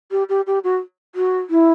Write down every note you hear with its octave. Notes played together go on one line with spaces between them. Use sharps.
G4
G4
G4
F#4
F#4
E4